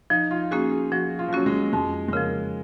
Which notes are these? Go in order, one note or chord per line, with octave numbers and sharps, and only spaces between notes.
F3 D#4
F4
A#3 C#4 F#4 G#4
G#4
F3 F#4
F4
F3
F#3 A#3 C#4 F#4
G#3
F2 G#3
G#3
C#3 F3 A#3